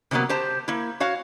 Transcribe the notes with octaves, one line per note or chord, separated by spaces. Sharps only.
C3 F3 F#3 A#3 B3
G4 C5 A5
A#3 E4
F#4 C#5 F5